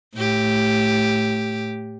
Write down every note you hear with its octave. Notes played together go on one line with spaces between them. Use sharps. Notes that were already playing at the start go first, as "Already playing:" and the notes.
A2 G4